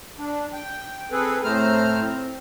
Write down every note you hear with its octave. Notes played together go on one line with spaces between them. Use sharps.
D4
G5
C4 G#4 A4 B4
A2 A3 C4 C5 A#5 F6
C4